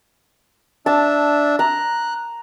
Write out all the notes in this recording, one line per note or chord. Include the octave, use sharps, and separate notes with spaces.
D4 E5 A5
A#5 F#6